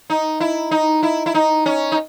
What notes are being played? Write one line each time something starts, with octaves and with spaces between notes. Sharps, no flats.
D#4
E4
D#4
E4
E4
D#4
C#4
D#4